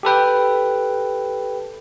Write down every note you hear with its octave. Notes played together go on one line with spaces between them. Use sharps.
G4 A4 B4 G5